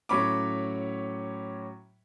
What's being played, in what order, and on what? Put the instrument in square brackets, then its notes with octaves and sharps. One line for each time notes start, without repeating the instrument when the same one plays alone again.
[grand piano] A2 F#3 C#4 B5 C#6 D6